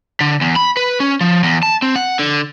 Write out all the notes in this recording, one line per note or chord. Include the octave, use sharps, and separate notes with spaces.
D3
E2
B5
B4
C#4
F3
E2
A5
C4
F#5
D3